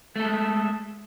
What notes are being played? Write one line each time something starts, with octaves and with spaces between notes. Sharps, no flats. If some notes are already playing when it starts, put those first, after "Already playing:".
G#3 A3 A4